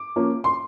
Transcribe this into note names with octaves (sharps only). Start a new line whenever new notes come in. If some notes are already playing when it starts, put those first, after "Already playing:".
Already playing: D6
F3 A#3 C#4
C6